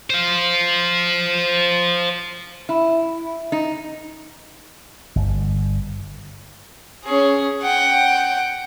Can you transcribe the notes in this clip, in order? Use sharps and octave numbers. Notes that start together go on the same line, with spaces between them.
C5 F5
E4
D#4
G1
C#4 G#4
F#5 G5